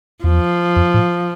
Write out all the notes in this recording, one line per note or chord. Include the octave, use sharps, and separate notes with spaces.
E2 F3
F2
A2